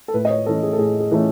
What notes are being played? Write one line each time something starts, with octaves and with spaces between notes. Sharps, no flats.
A4
A2 B4
D#5
C#5
E3 A3 C#4 A4
G#4
A4
A2 G#4
G#4
E3 A3 C#4